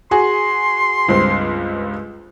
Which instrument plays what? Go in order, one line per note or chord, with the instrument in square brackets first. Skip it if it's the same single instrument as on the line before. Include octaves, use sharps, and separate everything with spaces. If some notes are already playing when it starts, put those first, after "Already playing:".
[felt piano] F#4 G#4 G#5 [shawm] C6
[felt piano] C#2 G2 C4